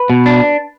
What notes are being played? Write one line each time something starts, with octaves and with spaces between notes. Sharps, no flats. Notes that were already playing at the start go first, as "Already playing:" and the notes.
Already playing: B4
B2
D4